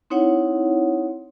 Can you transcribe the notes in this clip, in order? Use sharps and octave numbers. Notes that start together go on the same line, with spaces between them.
C4 D#4 E4 C#5 F#5